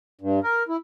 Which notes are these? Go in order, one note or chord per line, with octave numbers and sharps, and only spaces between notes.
G2
A#4
E4